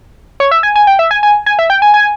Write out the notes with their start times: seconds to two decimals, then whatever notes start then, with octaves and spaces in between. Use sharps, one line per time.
0.40 C#5
0.51 E5
0.63 G#5
0.75 G#5
0.87 G5
0.99 E5
1.11 G#5
1.23 G#5
1.46 G#5
1.59 E5
1.70 G5
1.82 G#5
1.94 G#5